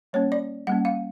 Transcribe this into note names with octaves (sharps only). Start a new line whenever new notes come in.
G3 A#3 C#4 C#5
D5
G3 A#3 C#4 F#5
F5